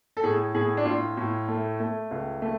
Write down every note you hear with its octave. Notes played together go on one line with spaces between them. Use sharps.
A4
A2 G#4
A2 G#4
D4
A2 F4
A2
A3
A3
C#2
A3